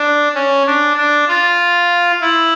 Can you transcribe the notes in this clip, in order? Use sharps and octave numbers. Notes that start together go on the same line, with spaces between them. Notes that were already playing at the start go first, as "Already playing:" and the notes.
Already playing: D4
C#4
D4
D4
F4
E4